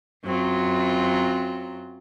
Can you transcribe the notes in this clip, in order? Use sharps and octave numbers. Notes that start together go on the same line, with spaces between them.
F#2 F#3 C4 F4